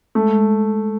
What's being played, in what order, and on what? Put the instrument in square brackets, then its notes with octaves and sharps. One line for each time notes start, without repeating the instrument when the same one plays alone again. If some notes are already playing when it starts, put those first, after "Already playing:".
[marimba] G#3 [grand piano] A3
[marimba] G#3